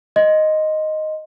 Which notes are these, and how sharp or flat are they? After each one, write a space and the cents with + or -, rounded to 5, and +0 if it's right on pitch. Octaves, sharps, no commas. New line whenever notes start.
D#5 +0 C6 +0